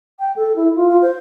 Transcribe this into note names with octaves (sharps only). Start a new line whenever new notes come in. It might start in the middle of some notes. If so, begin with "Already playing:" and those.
G5
A4
E4
F4
F4
C5